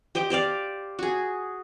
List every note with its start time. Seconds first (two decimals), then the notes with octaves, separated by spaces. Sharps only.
0.15 G4 C5 D#5 G5
0.30 G4 C5 D5 F5
0.99 F#4 G#4